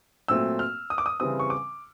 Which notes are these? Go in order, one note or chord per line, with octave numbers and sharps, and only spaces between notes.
A#2 F#3 A3 C4 E6
F6
D#6
D6
D#6
C#3 E3 G3 C4 D#6
C#6
D6